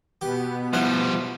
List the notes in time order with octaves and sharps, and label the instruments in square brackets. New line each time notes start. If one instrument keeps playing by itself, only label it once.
[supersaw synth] B2 B3 [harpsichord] G4
[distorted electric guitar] F3 G3 [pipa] E4 F#5 [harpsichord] F5